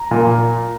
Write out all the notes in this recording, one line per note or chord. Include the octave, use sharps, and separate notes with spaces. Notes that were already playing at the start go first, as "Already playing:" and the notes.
Already playing: A#5
A#2